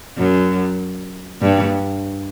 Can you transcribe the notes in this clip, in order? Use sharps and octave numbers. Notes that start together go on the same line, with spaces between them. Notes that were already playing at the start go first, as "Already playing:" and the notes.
F#2
G2